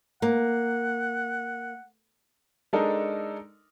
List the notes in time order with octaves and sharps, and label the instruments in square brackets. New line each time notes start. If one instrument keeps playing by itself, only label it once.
[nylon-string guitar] A#3 [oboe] F#5
[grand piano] G#3 D4 D#4 A4 A#4